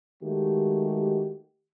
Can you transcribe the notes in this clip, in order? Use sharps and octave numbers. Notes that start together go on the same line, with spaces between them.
D#3 G#3 A3 F#4 G4